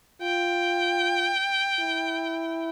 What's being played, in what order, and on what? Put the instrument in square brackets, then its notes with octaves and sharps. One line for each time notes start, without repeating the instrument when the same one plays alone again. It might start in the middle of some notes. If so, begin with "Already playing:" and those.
[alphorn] F4 [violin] G5
[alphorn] E4